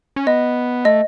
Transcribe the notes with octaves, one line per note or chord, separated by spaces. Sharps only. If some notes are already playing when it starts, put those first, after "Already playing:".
C#4
B3 D#5
A3 D#5